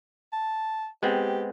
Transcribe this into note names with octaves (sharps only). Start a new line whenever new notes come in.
A5
G#3 B3 C4 G4